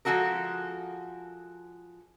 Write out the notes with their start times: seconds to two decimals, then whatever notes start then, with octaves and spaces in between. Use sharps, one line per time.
0.05 F3 G#3 F#4 A4 A#4